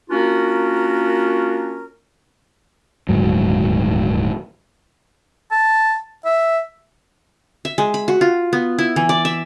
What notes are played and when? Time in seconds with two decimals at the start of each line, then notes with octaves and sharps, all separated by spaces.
0.10 A#3 C#4 D4 F4 F#4 A#4
3.09 D#1 D2 G#2 F#3
5.51 A5
6.25 E5
7.65 E5
7.78 G#3
7.94 B5
8.08 F#4
8.21 F4
8.53 B3
8.78 E4
8.96 E3
9.09 D5
9.25 E5